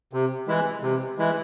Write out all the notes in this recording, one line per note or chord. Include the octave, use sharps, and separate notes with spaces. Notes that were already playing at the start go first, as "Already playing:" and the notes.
C3
E3 G#3 E4
C3
E3 G#3 E4